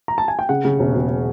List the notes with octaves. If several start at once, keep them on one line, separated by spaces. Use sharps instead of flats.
A#5
A5
G#5
G5
C#3 F#5
C#3
E1
E1